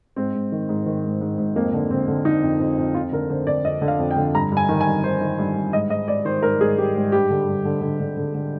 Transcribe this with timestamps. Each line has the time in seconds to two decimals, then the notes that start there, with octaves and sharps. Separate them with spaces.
0.16 G#2 C4
0.34 G#2
0.52 D#3
0.69 G#2
0.86 D#3
1.04 G#2
1.21 G#2
1.38 G#2
1.56 F2 A#3
1.74 D3
1.90 D3 C4
2.08 D3
2.25 D3 D#4
2.43 F2
2.60 F2
2.78 F2
2.95 F2 F4
3.12 D3 A#4
3.30 D3 C5
3.47 F2 D5
3.64 F2 D#5
3.82 D3
3.88 F5
3.99 F2
4.11 G5
4.16 D3
4.35 G2 A#5
4.52 G2 G#5
4.69 D#3
4.81 G#5
4.87 G2
5.04 D#3 C5
5.21 D#3
5.39 G2
5.55 G2
5.73 G#2 D#5
5.90 G#2 D#5
6.08 G#2 D5
6.25 D#3 C5
6.43 G#2 A#4
6.60 G#2 G#4
6.77 G#2 G4
6.96 G#2
7.12 G2 G4
7.30 D3
7.48 G2
7.65 D3
7.81 D3
8.00 D3
8.17 D3
8.35 D3